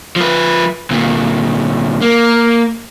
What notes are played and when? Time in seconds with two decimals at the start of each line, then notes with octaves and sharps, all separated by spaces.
0.16 F3 B4
0.91 D2 A#2
2.02 A#3